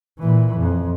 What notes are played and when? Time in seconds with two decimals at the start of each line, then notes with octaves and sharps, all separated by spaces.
0.19 A#2 E3
0.58 F2